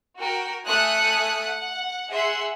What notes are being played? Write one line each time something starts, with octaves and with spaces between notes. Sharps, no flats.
F#4 A#4 G5
A3 G#5 D#6 F#6 C#7
F#5
G#4 E5 F#5 C6